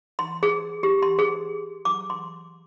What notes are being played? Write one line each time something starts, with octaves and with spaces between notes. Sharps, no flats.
C6
G#4
G4
C6
G#4
D6
C6